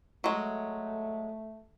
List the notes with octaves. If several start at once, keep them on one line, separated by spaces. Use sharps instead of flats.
F#3 G#3 A3